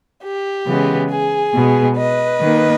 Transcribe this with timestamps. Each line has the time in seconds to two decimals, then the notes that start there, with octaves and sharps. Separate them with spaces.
0.24 G4
0.67 C#3 E3 G#3 B3
1.10 G#4
1.54 B2 G#3 B3
1.97 B4 D#5
2.41 D#3 A#3